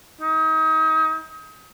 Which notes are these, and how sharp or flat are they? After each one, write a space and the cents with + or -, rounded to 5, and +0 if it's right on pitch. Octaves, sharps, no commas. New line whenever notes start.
D#4 +35